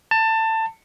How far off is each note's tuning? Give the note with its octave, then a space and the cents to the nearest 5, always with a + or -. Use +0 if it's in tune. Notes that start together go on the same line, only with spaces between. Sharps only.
A5 +20